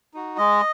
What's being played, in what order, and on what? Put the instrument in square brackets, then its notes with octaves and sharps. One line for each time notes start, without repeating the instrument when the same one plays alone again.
[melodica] D#4 F#4
G#3 D#5